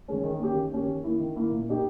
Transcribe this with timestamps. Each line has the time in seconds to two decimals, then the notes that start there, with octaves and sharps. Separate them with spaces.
0.08 D#3 G#3 C#4
0.24 D#3
0.39 A#3 C#4 G4
0.55 D#3
0.72 A#3 C#4 G4
0.87 D#3
1.04 A#3 E4
1.19 D#3
1.36 A#3 E4
1.52 A#2
1.68 A#3 D#4 G4